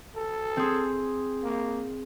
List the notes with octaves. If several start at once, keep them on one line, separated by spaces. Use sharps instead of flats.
A4
C4 G#4
A#3